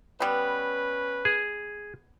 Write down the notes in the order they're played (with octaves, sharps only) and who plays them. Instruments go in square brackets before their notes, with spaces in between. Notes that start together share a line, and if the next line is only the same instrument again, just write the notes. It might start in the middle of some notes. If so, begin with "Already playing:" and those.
[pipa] G3 B3 [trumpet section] C#4 B4
[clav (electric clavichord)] G#4